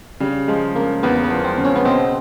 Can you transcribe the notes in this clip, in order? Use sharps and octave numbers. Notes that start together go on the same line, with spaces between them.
C#3 G3
F3 G#3
C#3 A#3
E2 B3
B3
F3
C4
C#3
C#4
B3
B2 C4